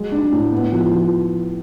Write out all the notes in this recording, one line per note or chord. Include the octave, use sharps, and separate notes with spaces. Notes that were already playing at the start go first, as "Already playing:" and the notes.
Already playing: F#3 G#3
D4
A2
B3
F3
F3